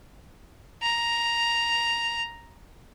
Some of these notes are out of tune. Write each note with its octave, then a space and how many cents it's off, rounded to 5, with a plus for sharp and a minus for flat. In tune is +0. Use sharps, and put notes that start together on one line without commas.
A#5 +5